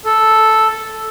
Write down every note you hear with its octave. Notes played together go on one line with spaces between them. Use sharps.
A4